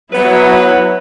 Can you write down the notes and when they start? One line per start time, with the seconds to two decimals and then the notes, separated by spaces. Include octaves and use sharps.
0.13 F#3 B3 E4 B4